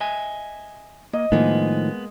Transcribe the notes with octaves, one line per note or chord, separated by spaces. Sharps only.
D#5 E5 G#5
A#3 D#5
A2 D#3 F3 G#3 A#3 B3